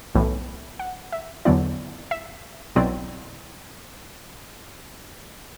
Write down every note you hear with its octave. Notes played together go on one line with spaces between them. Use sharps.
B1 A2 E3
F#5
E5
E2 D3 F#3 B3 E4 D5
E5
B1 B2 F#3 C4 E4 D5